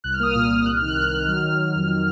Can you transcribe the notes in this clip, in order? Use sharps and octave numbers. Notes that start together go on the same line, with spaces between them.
C2 F#6
F6
A#3 D#6
A#2 F6
C2
C2 F#6
F6
D#3
F#6
C2 F6
D#3
F#3 F6
D#3
D#3
F2